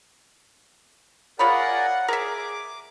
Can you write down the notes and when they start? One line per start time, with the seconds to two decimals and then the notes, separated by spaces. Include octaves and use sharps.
1.39 F4 G#4 A#4 C#5 D5 F#5 B5
2.08 G#4 A#4 E5 D6